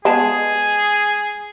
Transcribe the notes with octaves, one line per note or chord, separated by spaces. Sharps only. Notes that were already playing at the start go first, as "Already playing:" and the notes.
G#3 B3 G#4 A5